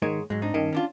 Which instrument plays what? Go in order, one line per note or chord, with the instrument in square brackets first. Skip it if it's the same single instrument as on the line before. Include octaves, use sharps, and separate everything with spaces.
[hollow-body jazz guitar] G#2 G#3 C#5 [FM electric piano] D#3
[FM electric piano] G#2 [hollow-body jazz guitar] F#3 G#3
[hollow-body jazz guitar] C4 D4 D#4
[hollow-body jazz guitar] G2 C#4 D#5 [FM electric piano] D#3
[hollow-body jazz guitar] C#4 D4 F4